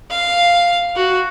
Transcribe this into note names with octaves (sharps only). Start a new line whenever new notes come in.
F5
F#4